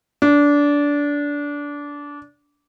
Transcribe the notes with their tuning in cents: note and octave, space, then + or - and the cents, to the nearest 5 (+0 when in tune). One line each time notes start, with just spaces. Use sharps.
D4 -20